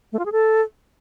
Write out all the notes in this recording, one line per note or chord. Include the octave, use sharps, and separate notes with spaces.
A3
F4
G#4
A4